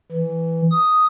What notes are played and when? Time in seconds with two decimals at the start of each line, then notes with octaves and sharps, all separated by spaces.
0.12 E3
0.71 D#6